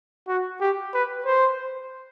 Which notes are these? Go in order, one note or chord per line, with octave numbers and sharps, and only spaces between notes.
F#4
G4
B4
C5